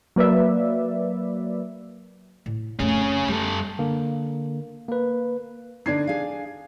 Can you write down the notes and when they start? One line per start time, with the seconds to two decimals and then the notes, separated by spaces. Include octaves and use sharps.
0.16 F#3 A#3 B4 D5 E5
2.46 A2
2.80 F2 A3 C#4 G#4
3.28 F#2 G3 A4
3.79 D3 A#3
4.88 A#3 B4
5.86 D3 D4 D#4 G#6 C7
6.07 G#4 F5